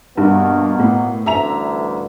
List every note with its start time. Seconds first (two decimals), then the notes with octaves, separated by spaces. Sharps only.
0.18 G2 B2 A#3 B3
0.79 A2
1.26 A1 D2 G2 E5 A#5 F7